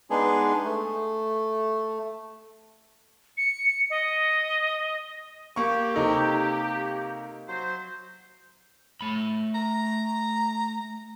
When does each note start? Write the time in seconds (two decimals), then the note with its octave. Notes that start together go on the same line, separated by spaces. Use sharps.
0.10 G#3 B3 D4 D#4 G#4
0.64 A3
3.37 C#7
3.90 D#5
5.56 A#3 G4 C#6
5.94 C3 D#4 A4
7.47 F#3 C5
9.01 A3 B5
9.54 A#5